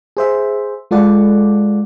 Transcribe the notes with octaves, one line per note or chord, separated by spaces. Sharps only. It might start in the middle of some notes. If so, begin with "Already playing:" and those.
G#4 C5 E5
G#3 F4 A4 D5 F#5